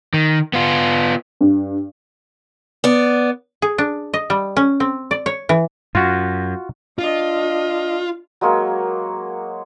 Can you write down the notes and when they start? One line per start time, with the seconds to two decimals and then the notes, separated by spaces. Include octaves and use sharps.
0.14 D#3
0.53 B3 F4
1.41 G2
2.84 B3 D5
3.62 G#4
3.78 D4
4.14 D#5
4.30 G3
4.56 C#4
4.80 C4
5.11 D5
5.26 C#5
5.49 E3
5.95 F#2 F4 F#4
6.99 D4 F4 D#5
8.41 F#3 G#3 A#3 C#5